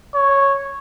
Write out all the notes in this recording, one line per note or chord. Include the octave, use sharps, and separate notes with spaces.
C#5